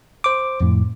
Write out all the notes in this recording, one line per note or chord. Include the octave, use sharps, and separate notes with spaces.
C5 D6
F2 A2